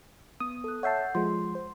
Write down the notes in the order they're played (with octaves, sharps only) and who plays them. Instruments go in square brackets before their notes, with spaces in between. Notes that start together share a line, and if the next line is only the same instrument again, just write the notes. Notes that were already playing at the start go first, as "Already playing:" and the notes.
[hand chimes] B3 [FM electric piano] D#6
[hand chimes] A4 F#6
[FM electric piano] C#5 E5 A5 [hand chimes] F#5 G6 C7
[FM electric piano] F3 G#3 [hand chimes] C6
[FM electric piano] C5